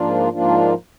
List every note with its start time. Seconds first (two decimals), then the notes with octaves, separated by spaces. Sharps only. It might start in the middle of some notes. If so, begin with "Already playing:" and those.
Already playing: G#2 F3 A#3 D4 F4
0.32 G#2 F3 A#3 D4 F4